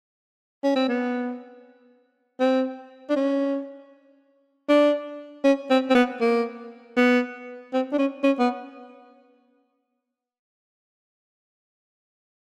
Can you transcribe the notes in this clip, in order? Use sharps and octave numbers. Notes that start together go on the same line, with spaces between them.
C#4
C4
B3
C4
D4
C#4
D4
C#4
C4
C4
B3
A#3
B3
C4
D4
C#4
C#4
B3